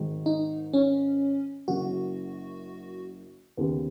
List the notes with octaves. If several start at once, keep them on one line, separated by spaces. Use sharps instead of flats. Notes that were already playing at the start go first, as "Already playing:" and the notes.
Already playing: G#1 G#2 D#3 F#3
D#4
C#4
F#1 F#2 C#3 F#4
D#2 C#3 B3